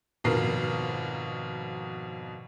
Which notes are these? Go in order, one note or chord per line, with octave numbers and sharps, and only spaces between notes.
G#1 F2 B2 A#4 C7